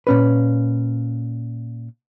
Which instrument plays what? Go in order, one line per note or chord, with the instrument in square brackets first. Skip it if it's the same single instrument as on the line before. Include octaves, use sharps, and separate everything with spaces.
[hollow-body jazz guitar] A#2 C#4 B4